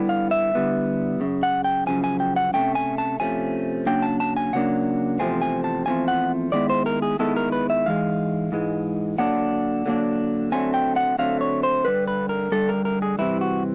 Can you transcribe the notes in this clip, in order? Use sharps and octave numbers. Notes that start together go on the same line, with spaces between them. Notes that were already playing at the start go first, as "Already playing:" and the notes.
Already playing: D3 G3 B3 E4
F5
E5
D3 G3 B3 E4
F#2 C#3
F#5
G5
F#2 C#3 F3 G#5
G#5
G5
F#5
C3 F3 A3 C#4 G5
G#5
A5
C3 F3 A3 C#4 G#5
C#3 F#3 A#3 D4 G5
A5
A5
G#5
C#3 F#3 A#3 D4 F#5
E2 C3 F3 A3 C4 G#5
G#5
A5
E2 C3 F3 A3 C4 G#5
F#5
D#3 G#3 B3 E4 D5
C5
A#4
G#4
D#3 G#3 B3 E4 A4
A#4
B4
E5
G#2 E3 G#3 F5
G#2 E3 G#3
D3 F#3 A#3 D4 F#5
D3 F#3 A#3 D4
D3 F#3 A3 C4 G#5
G5
F#5
D3 F#3 A3 C4 F5
C#5
C5
G2 D3 G3 B4
B4
A#4
G2 D3 G3 A4
A#4
A#4
G#4
C3 E3 G3 E4
F#4